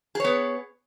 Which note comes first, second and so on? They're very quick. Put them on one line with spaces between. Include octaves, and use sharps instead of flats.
G#4 C#5 B3